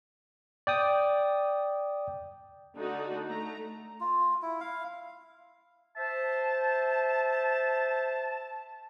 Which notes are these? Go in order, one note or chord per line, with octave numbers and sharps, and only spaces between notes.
D5 G5 D#6
D3 A3 D#4 F#4
A3 A#5
F4
E4
F5
C5 E5 A5